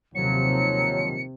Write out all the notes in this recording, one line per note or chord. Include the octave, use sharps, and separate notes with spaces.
D#2 C3 D#3 F3 F#3 C#7